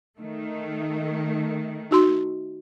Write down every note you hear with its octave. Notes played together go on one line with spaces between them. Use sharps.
D#3 A3
D#4 F#4 C6